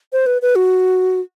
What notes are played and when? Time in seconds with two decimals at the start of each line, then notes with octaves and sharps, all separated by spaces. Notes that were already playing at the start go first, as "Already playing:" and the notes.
0.13 C5
0.26 B4
0.42 B4
0.56 F#4